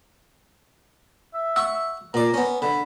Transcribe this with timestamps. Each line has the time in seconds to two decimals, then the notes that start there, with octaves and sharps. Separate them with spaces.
1.34 E5
1.56 F#5 C#6 E6
2.14 A#2 D5 A#5
2.34 B3 C#4
2.62 D3 B5